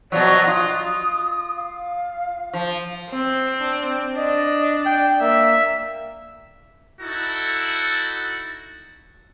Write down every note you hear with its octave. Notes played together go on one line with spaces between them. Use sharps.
B2 F3 F#3 D5
F4 D#6
F5
F3
C4
D4
D4 D#5
G5
A#3 E5
D#4 E4 F#4 A4